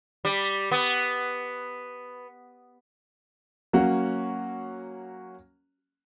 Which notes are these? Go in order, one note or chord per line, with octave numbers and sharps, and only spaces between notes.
G3
B3
F#3 A#3 C#4 F#4